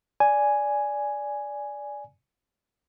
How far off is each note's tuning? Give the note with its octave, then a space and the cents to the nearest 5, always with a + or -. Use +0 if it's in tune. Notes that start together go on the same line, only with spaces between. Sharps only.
D5 -10 G#5 +0